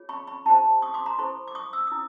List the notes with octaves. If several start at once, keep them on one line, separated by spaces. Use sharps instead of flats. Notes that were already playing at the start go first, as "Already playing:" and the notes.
Already playing: F4 G#4 C#5
B5 C#6
B5 C#6
E4 G4 C5 A5 B5
C#6 D#6
C6 D6
A#5 C6
E4 A4 C5 B5 C#6
D6
C#6 D#6
E6
E4 D#6